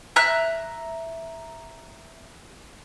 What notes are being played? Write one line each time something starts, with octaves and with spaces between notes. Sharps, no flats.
E5 A#5 F#6